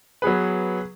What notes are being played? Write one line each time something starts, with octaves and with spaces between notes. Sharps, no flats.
F#3 B3 G#4 B4